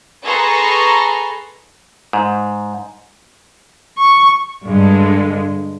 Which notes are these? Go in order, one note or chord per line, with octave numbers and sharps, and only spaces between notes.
G#4 A4 B4 A#5 C6 C#6
G#2
C#6
G2 D3 G#3